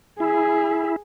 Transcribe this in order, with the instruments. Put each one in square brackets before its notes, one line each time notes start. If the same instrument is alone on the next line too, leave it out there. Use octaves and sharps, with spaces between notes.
[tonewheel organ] E4 [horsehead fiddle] G#4